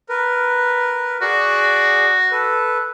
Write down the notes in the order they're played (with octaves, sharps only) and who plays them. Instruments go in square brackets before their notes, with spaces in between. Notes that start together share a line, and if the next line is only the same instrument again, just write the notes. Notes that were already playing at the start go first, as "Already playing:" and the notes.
[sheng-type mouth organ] A#4 B4
[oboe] F#4 [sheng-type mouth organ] G#4 D5
[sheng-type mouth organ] A4 B4